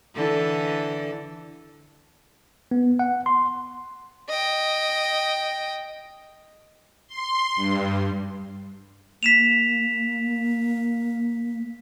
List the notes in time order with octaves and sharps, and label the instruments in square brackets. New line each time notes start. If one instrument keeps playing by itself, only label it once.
[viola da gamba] D3 E3 A4
[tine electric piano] B3
F#5
C6
[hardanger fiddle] D#5 G5
[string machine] C6
G2
[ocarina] A#3 [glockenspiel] B6 E7 F7